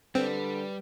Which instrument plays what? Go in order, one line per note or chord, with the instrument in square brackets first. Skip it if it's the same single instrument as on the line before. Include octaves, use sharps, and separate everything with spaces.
[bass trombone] D3 [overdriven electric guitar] G3 [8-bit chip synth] C4 [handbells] B4